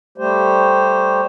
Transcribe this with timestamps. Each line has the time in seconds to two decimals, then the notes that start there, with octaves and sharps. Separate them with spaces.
0.18 G3 A3 G4 C5